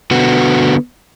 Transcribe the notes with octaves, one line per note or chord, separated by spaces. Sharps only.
D3 B3 F#4